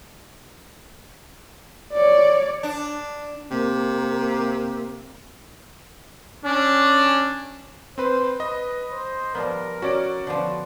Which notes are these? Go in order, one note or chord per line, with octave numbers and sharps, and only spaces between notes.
C#5 D5
D4
C3 A#3
C#4 D4
C4 B4 C5 B5
B4 D#5
C5
F3 G3 B3 A#4
C#4 F#4 D5 D7
D3 F3 B3